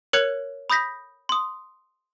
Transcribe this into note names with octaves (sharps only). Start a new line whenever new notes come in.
A#4 C#5 F#6 G#6 C#7 F7
B5 D#6 G6 A#6 B6
C6 D#6